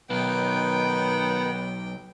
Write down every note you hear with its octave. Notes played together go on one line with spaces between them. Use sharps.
B1 B2 D#3 B3 D#4 G5